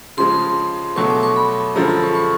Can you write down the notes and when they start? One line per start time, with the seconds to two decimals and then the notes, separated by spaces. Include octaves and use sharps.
0.17 C#3 F3 G#3 C6
0.96 B2 F#3 A3 C#6
1.10 D6
1.23 C#6
1.36 B5
1.76 F#2 D3 F3 G#3 A#5
1.89 B5
2.03 C#6
2.15 C#6